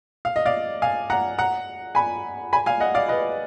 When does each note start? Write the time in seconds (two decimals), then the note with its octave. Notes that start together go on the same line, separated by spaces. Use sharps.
0.25 F5
0.36 D#5
0.46 D5 F5
0.82 F5 G#5
1.10 F#5 A#5
1.38 F#5 A#5
1.95 G#5 B5
2.53 G#5 B5
2.66 F5 G#5
2.80 D#5 F#5
2.95 D5 F5
3.08 B4 D#5